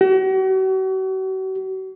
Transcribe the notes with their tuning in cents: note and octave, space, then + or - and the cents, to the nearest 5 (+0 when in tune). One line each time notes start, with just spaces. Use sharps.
F#4 +40